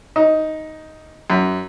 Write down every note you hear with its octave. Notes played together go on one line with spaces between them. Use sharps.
D#4
F#2